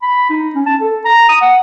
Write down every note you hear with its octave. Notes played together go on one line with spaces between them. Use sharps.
B5
D#4
C#4
A5
A4
A#5
D#6
F#5